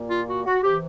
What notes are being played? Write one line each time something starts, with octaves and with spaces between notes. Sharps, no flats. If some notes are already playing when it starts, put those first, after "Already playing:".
Already playing: A#2 G3 A#3
F4
F#4
F#4
C3 E3 G4